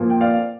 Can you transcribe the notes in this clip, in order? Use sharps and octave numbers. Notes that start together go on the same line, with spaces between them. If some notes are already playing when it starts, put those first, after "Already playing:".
Already playing: A#2 F3 A#3
G5
D5 F5